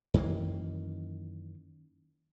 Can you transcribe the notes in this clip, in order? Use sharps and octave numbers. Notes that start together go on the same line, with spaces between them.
F#2 D#3 E3 A#3